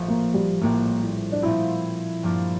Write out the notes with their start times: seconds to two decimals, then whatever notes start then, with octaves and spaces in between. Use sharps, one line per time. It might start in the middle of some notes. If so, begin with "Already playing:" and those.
Already playing: A#1 A2 F3 A3
0.08 A#3
0.34 G3
0.62 A#1 A2 G3 A#3 C4
1.01 E4
1.32 D4
1.42 A#2 F3 A3 C4 E4
2.23 G2 F3 A#3 D4 F4